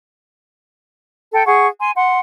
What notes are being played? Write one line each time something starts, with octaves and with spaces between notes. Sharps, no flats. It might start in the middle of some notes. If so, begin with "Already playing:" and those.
A4 G5
G#4 F#5 C#6
G#5 C6
F#5 C6